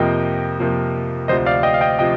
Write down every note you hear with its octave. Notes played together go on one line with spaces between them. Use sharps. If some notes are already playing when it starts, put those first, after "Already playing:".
Already playing: F2 C3 F3 A#3 D#5 G5
F2 C3 F3 A#3
D2 C3 F3 C5 D#5
D5 F5
D#5 G5
F5
D#5 G5
C3 F3 D#5 G5